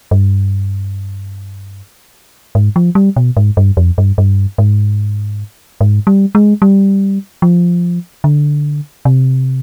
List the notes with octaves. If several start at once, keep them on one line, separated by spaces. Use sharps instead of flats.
G2
G#2
F3
G3
B2
G#2
G2
F2
G2
G2
G#2
G#2
G3
G#3
G3
F3
D3
C3